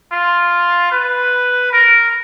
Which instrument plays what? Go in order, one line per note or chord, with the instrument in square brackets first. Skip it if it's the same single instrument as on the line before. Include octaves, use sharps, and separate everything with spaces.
[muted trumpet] F4
B4
A#4